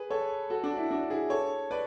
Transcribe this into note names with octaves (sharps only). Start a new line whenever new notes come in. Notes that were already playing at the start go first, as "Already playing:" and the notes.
Already playing: G#4 B4
A4 C#5
F#4 A4
D4 F#4
E4
D4 F#4
E4 G#4
A4 C#5
B4 D5